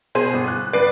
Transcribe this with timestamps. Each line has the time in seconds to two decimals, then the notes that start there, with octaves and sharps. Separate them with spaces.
0.15 B2 G#4 C5 D#7
0.33 G1
0.48 F#6
0.73 G1 B4 D5 C7 D7